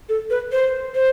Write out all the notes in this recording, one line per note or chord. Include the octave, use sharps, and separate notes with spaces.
A4
B4
C5
C5